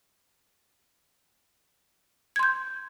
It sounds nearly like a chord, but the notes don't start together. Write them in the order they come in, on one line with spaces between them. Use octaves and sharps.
G#6 C6 G6